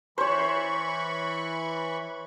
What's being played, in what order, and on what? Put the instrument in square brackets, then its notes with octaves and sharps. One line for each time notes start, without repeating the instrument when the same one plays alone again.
[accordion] E3 B5 C#6 [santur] C5 C#5